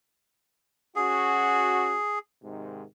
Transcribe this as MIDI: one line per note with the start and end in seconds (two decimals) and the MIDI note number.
0.96 1.97 61
0.96 1.97 66
0.96 2.19 68
2.43 2.84 44
2.43 2.84 48
2.43 2.84 51